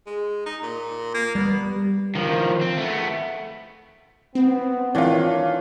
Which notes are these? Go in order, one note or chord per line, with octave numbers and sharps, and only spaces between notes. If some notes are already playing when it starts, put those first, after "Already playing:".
G#3
D#4
A#2
A#3
G3 B3
D#3 F3
C4
A3 B3
B3 C4
D#3 E3 A#3 D4 F4 C#5